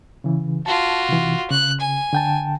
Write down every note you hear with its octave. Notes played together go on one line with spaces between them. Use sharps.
C#3 E3
F4 F#4 A5
C3 E3
C#3 F#6
G#5
D3 G5 A5